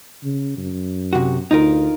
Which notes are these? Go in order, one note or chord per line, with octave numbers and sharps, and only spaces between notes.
C#3
F#2
C3 F#4
D2 D#4 F4 A#4